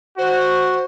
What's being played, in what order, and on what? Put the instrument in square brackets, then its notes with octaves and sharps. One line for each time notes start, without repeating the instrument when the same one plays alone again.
[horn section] F#4 [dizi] C5